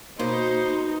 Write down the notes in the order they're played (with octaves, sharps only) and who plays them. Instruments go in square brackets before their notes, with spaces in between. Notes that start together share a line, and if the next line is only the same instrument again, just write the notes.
[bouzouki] B2 [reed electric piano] A#3 [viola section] D#4 [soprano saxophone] C5